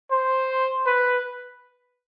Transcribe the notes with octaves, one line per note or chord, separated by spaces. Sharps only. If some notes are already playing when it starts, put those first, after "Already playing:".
C5
B4